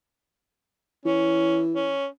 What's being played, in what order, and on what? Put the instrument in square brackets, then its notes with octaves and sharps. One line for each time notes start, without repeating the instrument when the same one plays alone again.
[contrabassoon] E3 [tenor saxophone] C#4
[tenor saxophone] C#4